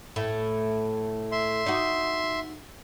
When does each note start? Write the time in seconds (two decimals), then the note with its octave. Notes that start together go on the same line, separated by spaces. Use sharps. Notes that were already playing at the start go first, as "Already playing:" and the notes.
0.16 A2 A3
1.32 E5 C6
1.66 D#4 F#4